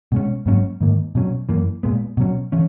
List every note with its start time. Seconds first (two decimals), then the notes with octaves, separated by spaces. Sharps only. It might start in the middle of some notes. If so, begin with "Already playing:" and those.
0.12 B2 G#3 C#4
0.46 G#2 F#3 A#3 C#4
0.81 G#2 D#3 A#3
1.15 B2 F#3 C#4
1.49 F#2 E3 A#3
1.83 A#2 G#3 B3
2.17 B2 F#3 C#4
2.52 E3 C#4